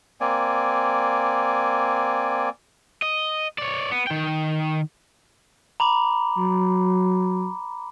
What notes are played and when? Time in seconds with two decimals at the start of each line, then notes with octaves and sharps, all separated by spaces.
0.21 A#3 C4 D5 G#5
3.02 D#5
3.58 C#5 D5
3.92 B3
4.07 D#3 G5
5.80 A#5 B5 D6
6.38 F#3